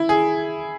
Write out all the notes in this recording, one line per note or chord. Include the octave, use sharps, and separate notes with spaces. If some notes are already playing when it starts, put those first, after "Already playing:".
Already playing: E4
G#4